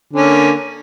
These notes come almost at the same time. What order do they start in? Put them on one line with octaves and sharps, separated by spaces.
D3 C#4 A#3